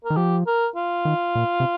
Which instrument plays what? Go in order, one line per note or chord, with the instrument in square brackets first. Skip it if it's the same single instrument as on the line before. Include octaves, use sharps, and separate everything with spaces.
[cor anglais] A#4
[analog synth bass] D#3
[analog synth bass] F3 [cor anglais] G4
[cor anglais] A#4
F4
[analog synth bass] D#3
A#2
C3